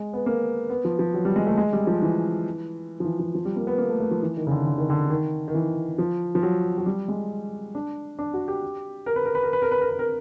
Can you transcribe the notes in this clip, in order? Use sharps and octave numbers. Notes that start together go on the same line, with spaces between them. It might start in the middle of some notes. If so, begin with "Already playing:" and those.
Already playing: G#3
B3
A#3
B3
F3
F3
F#3
G3
G#3
A3
G#3
G3
F3
E3
F3
E3
F3
F3
G3
A#3
B3
A#3
A3
A3
F3
E3
D#3
C#3
D3
D3
D#3
D3
D#3
D#3
E3
F3
F3
F#3
F#3
G3
G#3
D4
D4
F#4
G4
A#4
B4
A#4
B4
A#4
B4
A#4
B4
A#4
B4
A#4